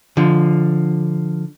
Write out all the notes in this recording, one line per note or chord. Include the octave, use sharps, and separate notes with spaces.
D3 F3